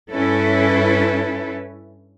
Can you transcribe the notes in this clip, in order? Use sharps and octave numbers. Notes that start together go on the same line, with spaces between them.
G2 C#4 E4 A4 B4